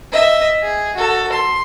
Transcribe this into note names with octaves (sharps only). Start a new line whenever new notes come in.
D#5 E5
G#4
F#4 A4
C6